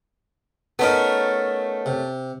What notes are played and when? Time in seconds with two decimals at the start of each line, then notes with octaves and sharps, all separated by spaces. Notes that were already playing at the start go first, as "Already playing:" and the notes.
0.79 A3 B3 C#4 D#4 A#4
1.86 C3